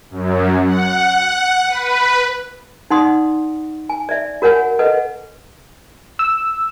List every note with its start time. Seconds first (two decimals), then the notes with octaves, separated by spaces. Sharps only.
0.11 F#2
0.66 F#5
1.67 B4
2.90 D#4 D5 F#5 C6 D#6
3.89 G#5
4.09 D5 E5
4.42 F#4 A#4 C#5 F#5 G#5
4.79 A4 B4 D#5 F#5
6.19 E6